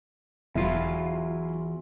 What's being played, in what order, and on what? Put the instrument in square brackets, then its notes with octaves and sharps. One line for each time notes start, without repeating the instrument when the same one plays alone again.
[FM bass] E1 [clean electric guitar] E2 F4 [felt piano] F#3 E4